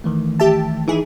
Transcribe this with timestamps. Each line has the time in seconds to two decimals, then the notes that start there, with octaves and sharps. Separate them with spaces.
0.04 D#3 E3 A3
0.40 G4 E5 A5
0.88 E3 D#4 E4 G#4